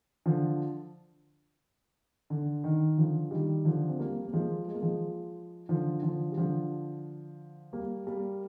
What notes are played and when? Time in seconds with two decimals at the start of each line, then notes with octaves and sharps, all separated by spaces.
0.26 D3 F3
2.30 D3
2.64 D#3
2.98 D3 F3
3.31 D#3 G3
3.65 D3 F3
3.89 C4
3.99 G3 A#3
4.27 A#3
4.33 F3 G#3
4.68 G#3
4.74 A#3
4.82 F3 G#3
5.69 D3 F3
6.03 D3 F3
6.32 G3
6.38 D3 F3
7.73 G3 A#3
8.07 G3 A#3